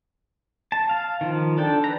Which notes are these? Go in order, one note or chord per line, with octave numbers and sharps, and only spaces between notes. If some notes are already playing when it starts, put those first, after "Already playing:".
A5
F5
D#3 F3
D4 A4 G5
B4 A#5